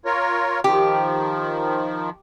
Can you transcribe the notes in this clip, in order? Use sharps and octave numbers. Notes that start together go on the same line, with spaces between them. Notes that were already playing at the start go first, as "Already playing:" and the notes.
F4 A#4 C#5
D#3 F3 G4